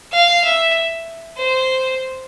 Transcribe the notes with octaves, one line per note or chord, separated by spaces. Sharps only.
F5
E5
C5